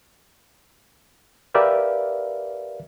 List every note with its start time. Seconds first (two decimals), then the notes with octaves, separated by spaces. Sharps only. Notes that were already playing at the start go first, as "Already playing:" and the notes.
1.54 G4 A#4 B4 D5 E5 F5